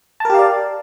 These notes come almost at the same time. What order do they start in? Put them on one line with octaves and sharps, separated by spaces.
A5 A#4 G4 F5 D5